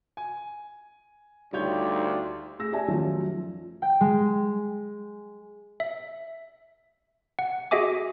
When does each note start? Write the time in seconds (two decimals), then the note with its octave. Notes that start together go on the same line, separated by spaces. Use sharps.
0.17 G#5
1.53 D2 G3 D#4 F4 G4 C#5 D5 G6
2.59 A3 G#4 E6 A#6
2.72 G4 D5 E5 G#5 A5
2.88 D#3 F3 F#3 A3 C#4 F4
3.30 F3
3.82 G5
4.01 G#3
5.80 E5
7.39 F#5
7.71 F#4 G#4 D#5 E5 G#5 D6